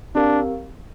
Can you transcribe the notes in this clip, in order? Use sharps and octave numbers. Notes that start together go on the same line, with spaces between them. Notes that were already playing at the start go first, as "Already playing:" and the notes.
C4 D4 G4 A#4 F5